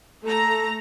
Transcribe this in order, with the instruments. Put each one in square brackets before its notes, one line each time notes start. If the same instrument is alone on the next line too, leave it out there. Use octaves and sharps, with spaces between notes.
[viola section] A3 A#5 [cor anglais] A4